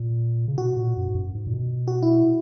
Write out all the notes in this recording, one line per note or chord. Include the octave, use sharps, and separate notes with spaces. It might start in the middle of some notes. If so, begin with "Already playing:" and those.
Already playing: A#2
C#3
B2 F#4
A#2
F#2
G#2
F#2
G#2
A#2
B2
F#4
E4